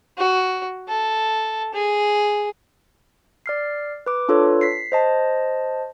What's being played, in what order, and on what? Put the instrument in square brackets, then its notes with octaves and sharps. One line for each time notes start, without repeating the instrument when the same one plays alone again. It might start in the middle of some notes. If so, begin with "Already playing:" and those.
[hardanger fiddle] F#4
A4
G#4
[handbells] D5 F6 C7
B4 D6
D4 F4 A4 B4 C#5
B6 C7
C5 D#5 A5